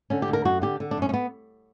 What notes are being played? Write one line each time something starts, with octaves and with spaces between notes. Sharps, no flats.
D3 C#4
G4
D2
A#4
F#2 F#4
D3 G4
D3
D4
F#2 C#4
C#4
B3